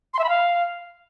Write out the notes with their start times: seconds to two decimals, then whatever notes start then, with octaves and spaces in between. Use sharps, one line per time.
0.14 C6
0.19 E5
0.24 B5
0.29 F5